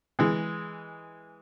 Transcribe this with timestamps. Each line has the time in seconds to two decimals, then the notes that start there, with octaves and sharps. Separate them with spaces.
0.19 E3 G#3